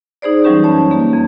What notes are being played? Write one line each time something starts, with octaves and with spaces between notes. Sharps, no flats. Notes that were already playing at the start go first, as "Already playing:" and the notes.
D#4 G#4 C5 D5
E3 F#3 G3 C#4 G4 B4
F#2 C#5 A5
A#3 G4
F2